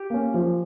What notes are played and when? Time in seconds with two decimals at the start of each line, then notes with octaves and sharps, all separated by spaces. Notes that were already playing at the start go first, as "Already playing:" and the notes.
Already playing: G4
0.10 A#3 C#4
0.34 F3